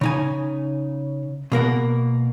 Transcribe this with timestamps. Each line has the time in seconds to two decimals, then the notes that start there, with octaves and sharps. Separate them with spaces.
0.01 C#3 D#4 G#5
1.52 B2 A#3 A#4 F#5